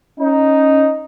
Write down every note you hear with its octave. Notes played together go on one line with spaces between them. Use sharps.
C#4 D#4